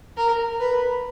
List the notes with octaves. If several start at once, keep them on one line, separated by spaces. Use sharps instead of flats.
A#4
B4